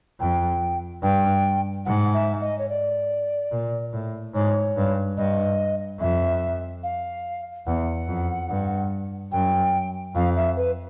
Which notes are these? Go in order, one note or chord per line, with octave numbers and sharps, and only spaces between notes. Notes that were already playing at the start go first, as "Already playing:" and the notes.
F2 G5
G2 G5
G#2 F#5
E5
D#5
C#5
D5
A#2
A2
G#2 C#5
G2
G2 D#5
F2 E5
F5
E2 F#5
F2
G2
F#2 G5
F2 F5
E5
B4